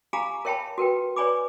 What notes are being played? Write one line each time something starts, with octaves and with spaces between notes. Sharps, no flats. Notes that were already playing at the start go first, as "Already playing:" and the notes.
G4 F5 G#5 A#5 B5 D6
A#4 C#5 E5 G5 A5 B5
F#4 A#4 B4 G5
B4 C#5 D5 G#5 B5 D6